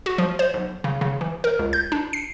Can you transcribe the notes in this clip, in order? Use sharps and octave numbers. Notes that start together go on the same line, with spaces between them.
F#4
F3
C5
B1
C#3
C#3
E3
A#4
C#2
G6
D4
C7